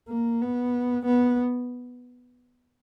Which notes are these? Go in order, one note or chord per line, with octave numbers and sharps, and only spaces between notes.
A#3
B3
B3